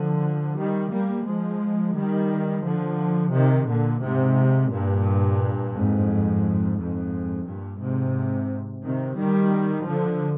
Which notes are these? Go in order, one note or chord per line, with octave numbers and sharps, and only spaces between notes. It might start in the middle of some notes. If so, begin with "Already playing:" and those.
Already playing: D3 F3
D#3 G3
G3 A#3
F3 G#3
D#3 G3
D3 F3
C3 D#3
A#2 D3
G#2 C3
G2 A#2
F2 G#2
F2 G#2
G2 A#2
G#2 C3
C3 D#3
D#3 G3
D3 F3